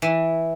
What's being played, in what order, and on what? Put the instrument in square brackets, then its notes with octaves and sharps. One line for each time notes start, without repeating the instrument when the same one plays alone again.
[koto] E3